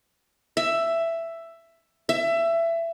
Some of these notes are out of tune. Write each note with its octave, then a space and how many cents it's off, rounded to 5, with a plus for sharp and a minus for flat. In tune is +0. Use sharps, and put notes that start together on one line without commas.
E5 +10
E5 +20